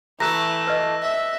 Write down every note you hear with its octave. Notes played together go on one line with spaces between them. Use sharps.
E3 A3 A4 A#5 E6 F#6 A#6
B4 D#5
E5